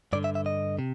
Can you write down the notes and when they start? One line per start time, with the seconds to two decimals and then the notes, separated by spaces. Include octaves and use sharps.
0.13 G2 D3 D5
0.24 E5
0.35 E5
0.46 D#5
0.79 C3